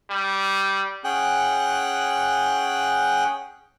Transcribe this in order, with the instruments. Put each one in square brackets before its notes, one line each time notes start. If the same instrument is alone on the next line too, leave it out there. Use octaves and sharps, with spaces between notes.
[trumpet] G3
[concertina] C#4 G#4 F#5 G5 F#6